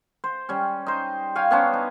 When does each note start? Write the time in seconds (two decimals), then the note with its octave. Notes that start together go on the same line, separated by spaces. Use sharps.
0.24 C5
0.49 G3 C#4
0.86 D#4 C5
1.35 C#5 F5 G5 G#5
1.51 B3 C#4 D4 C5
1.73 D#4